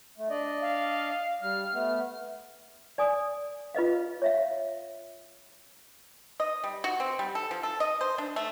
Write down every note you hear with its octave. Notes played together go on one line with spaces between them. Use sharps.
A3
D4 D5 D#5
F5
G3 F6
A3 B3
D5 G#5 D#6
F4 B4 D#5 F5
C#5 E5 F5
D#5
G3
F#4
C4
G3
A4
F3
A4
D#5
C5
D4
A3